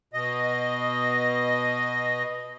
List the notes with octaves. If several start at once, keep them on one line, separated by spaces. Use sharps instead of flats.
B2 D#5